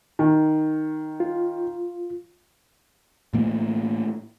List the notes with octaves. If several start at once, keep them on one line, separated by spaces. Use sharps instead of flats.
D#3
F4
A2 E3 A3 A#3